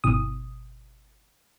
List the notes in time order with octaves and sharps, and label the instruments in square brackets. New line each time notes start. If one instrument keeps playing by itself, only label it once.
[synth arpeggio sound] G1 B2 D#6